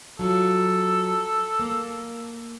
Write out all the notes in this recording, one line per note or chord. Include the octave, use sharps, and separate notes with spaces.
F#3 F4 A4
A#3